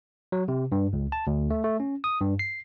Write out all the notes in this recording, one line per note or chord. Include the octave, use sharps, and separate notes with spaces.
F#3
C3
G2
C#2
A5
D2
A3
A3
C#4
D#6
G2
C7